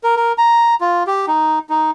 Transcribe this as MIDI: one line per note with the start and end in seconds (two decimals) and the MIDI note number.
0.03 0.15 70
0.16 0.32 70
0.38 0.75 82
0.81 1.03 65
1.07 1.26 67
1.28 1.59 63
1.69 1.91 63